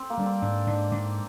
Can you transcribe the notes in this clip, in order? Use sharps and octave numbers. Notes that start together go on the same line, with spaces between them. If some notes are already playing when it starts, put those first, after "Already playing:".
Already playing: C4
A#3
G3 D4
C4
G#2 D4
G#2 D4
G#2 D4